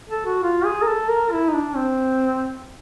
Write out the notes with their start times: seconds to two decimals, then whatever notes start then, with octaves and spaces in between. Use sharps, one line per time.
0.09 A4
0.26 F#4
0.43 F4
0.65 G#4
0.82 A#4
0.87 A4
1.09 A#4
1.32 E4
1.49 D#4
1.53 D4
1.76 C4